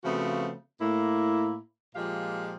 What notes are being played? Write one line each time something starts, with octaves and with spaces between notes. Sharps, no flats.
C#3 F3 A3 B3 C4 F#4
A2 A#3 E4
A#2 F3 G#3 G4 F5